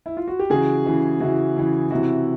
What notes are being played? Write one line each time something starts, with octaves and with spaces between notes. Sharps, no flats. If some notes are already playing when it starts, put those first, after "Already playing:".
E4
F4
F#4
G4
C#3 E3 F#4 G#4
C#3 E3
C#3 E3 E4 F#4
C#3 E3
C3 E3 E4 F#4